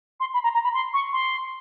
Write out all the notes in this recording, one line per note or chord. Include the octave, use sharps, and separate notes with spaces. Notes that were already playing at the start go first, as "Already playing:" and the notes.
C6
B5
A#5
A#5
B5
C6
C#6
C6